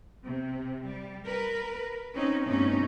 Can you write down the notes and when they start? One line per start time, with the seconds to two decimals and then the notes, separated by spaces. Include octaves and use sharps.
0.24 C3
0.85 G3
1.26 A#4 B4
2.13 C4 C#4 D#4
2.46 G2 C3 A3 B3 C#4 D#4